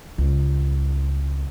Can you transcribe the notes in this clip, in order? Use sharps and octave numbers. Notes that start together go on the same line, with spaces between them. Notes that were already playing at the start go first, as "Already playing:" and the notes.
C#2